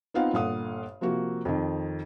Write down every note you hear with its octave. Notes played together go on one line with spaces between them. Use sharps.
B3 C4 D#4 F4 F5 F#5
G1 A#2 A4 F5 F#5 D#6
C3 F3 A#3 F#4
F2 D#3